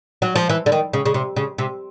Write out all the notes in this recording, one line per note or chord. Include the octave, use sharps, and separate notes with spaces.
F#3
F3
E3
D3
D#3
C#3
C#3
C3
C#3
C3